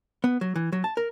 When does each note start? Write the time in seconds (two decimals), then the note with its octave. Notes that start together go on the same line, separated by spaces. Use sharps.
0.24 B3
0.41 F#3
0.56 E3
0.72 F#3
0.84 A5
0.97 A#4